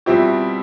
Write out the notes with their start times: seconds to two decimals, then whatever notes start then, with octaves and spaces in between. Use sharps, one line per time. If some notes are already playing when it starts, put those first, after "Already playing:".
0.06 B2 G3 C4 E4 F4 G4